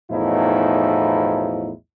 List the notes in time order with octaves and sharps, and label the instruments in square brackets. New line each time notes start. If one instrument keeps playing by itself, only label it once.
[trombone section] B1 E2 A2 F3 D#4 E4